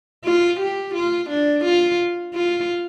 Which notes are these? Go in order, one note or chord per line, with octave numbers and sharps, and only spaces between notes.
F4
G4
F4
D4
F4
F4